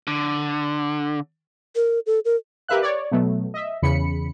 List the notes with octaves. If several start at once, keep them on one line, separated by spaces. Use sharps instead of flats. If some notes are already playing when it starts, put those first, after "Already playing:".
D3
A#4
A4
A#4
G4 A#4 B4 E5 F5 F#6
C#5 D5
B2 F#3 A3 B3
D#5 E5
E2 C#3 B5 C#7